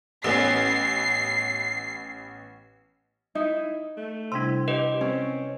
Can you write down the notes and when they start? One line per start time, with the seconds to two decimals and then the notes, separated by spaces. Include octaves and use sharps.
0.24 A1 B3 C#4 C7
3.35 D#4 E4
3.97 A3
4.32 C3 G3 D4 E4 C6
4.68 G4 B4 D#5
5.01 C4 C#4